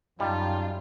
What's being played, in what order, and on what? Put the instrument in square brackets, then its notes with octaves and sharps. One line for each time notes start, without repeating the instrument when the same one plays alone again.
[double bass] F#2 [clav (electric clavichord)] G3 [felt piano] D#4 G5 A5 [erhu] F4